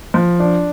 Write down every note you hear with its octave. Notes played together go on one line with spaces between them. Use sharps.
F3
D4